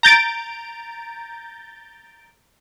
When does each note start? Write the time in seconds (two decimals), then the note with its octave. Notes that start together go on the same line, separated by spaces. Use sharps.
0.03 A#5 G6 A6 D7